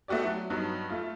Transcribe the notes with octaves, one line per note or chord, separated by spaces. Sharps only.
A3 B3 F#4 G4 D5
F#3
G2 F#3 B3 D#4
A3 F4